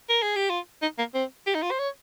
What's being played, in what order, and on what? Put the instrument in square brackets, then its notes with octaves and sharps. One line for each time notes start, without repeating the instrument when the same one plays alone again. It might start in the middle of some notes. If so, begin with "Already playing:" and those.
[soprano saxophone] A#4
G#4
G4
F4
D#4
A#3
C4
G4
D#4
F4
C5
C#5